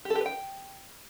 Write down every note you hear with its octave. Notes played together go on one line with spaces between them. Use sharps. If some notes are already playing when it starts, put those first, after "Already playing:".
G4
A4
G4
B4
G5